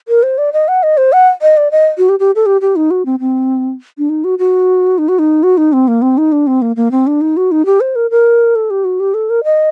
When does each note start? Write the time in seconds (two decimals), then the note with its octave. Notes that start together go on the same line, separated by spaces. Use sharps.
0.08 A#4
0.23 C5
0.38 D5
0.53 D#5
0.68 F#5
0.83 D#5
0.97 C5
1.13 F#5
1.42 D#5
1.57 D5
1.71 D#5
1.98 F#4
2.09 G4
2.20 G4
2.36 A4
2.46 G4
2.61 G4
2.76 D#4
2.91 F#4
3.06 C4
3.20 C4
3.98 D4
4.09 D#4
4.24 F#4
4.39 F#4
4.98 D#4
5.09 F#4
5.19 D#4
5.43 F#4
5.57 D#4
5.73 C4
5.88 A#3
6.02 C4
6.18 D#4
6.32 D4
6.47 C4
6.62 A#3
6.76 A#3
6.91 C4
7.07 D4
7.21 D#4
7.37 F#4
7.52 D#4
7.66 G4
7.80 C5
7.96 A#4
8.11 A#4
8.55 A4
8.70 G4
8.85 F#4
9.00 G4
9.14 A4
9.30 A#4
9.44 D#5